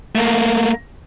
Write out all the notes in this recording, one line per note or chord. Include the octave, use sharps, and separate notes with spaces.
A3 A#3